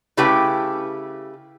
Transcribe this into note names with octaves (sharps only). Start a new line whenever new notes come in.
C#3 A3 E4 G4 B4 G5